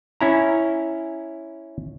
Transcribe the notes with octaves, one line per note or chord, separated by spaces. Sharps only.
C#4 E4 A#5